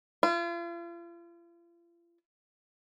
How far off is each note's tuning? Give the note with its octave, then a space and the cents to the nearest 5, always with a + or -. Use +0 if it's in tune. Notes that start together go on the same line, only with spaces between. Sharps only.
F4 -40